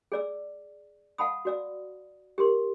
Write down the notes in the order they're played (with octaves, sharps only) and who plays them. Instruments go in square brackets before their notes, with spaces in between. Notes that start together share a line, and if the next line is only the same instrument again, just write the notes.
[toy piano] G#4 D5 E6
F5 F#5 A5 B5 D#6
F#4 D5 E6
G4 A#4 C6